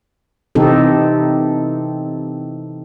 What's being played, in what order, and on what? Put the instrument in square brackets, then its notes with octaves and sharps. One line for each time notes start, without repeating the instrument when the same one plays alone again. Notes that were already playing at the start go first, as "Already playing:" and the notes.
[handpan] C3 E3 C4 D#4 G4 A4